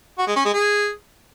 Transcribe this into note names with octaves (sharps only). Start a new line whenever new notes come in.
F#4
G#3
C#4
G#3
G#4